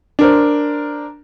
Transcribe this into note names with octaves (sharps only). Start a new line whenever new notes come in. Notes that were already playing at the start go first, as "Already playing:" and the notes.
D4 A#4 C5